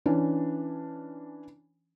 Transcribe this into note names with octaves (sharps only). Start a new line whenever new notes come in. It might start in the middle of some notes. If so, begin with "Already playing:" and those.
E3 C#4 D4